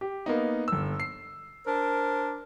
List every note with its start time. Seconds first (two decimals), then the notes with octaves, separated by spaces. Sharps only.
0.01 G4
0.26 A#3 B3 D#4
0.68 G1 E6
1.00 C7
1.65 D4 A#4 C5